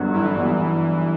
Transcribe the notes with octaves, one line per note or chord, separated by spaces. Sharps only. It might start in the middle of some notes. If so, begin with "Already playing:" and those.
Already playing: G1 G2 F#3 B3 F#4
G1 E3
G2 F#3 B3 F#4